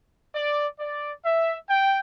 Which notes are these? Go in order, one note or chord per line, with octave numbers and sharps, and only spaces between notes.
D5
D5
E5
G5